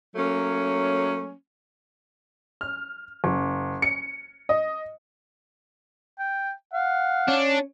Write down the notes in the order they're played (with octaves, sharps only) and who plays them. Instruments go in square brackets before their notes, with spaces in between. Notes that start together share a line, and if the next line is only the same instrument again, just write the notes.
[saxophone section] F#3 A3 A#3 C#4
[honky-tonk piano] F6
F#1
C#7
D#5
[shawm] G5
[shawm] F5 [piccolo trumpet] F#5
[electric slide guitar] C#4 [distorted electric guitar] D4